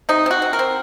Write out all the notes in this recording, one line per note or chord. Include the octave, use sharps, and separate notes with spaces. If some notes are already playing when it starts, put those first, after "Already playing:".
C3 D#4
C4 F#4
C4
A#4
C4